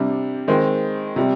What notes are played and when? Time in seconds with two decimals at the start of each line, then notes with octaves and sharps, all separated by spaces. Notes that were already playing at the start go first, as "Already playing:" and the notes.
Already playing: C3 G3 D4
0.48 D#3 G#3 C4
1.16 C3 G3